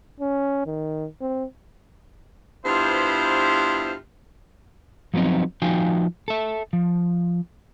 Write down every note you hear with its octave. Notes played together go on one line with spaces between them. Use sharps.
C#4
D#3
C4
G2 B3 E4 F4 C5
F3 F#3 B3 C4 D#4
F3 D#4 F#4 F5 G5 G#5
A4 E5
F3